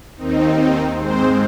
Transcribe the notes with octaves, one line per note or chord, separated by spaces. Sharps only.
D#2 D#3 C4 D#4
G#2 G#3 C4 C5